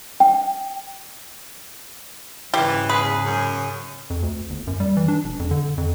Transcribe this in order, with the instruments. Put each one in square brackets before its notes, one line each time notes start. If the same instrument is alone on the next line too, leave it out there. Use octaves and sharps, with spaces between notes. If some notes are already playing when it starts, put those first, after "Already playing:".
[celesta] G5
[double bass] G#2 C#3 [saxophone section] E3 [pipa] G4
[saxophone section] E2 [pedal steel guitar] G#4 [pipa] B4
[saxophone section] F#2
[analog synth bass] F2
D2
G1
F#2
G3
E3
D4
E1
F2
D3
F2